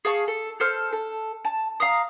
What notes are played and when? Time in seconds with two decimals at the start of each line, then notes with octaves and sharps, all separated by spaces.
0.05 G#4 F5 A5 C#6
0.28 A4
0.60 A4 C5 F6
0.93 A4
1.45 A5
1.80 F5 A#5 D#6